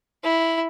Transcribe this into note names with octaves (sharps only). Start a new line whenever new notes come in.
E4